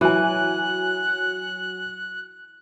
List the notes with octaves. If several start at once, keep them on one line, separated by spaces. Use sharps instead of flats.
E3 F#3 G#5 F#6